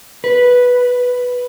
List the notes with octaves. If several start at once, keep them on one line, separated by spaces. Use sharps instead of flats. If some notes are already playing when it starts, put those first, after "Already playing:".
B4